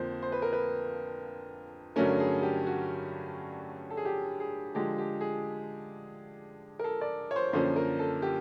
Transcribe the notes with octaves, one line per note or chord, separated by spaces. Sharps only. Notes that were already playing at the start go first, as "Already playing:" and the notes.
Already playing: F2 D3 F3 A#3 C5
C5
B4
A#4
B4
G2 D3 F#3 A3 C#4 A#4
G#4
G4
F#4
A4
G#4
G4
G#4
D3 F3 G#3 G4
G4
G#4
A#4
A4
D5
C#5
C5
F#2 D3 F3 A#3 C#4 C5
A#4
A4
G4